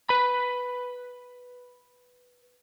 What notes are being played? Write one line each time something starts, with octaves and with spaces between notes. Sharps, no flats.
B4 B5